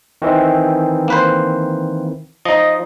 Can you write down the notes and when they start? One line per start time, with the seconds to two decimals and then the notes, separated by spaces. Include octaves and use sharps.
0.22 D#3 E3 C4
1.08 A#3 B4 C5
2.45 F3 D#4 D#5